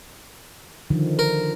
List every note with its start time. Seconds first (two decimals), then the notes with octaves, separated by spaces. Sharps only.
0.90 D3 D#3 F3
1.19 A#4